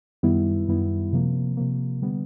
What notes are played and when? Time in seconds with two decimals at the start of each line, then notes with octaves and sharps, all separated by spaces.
0.23 F#2 D#3 G3 B3 E4
0.68 F#2 D#3 G3 B3 E4
1.12 C3 F3 A#3
1.57 C3 F3 A#3
2.02 D3 G3 B3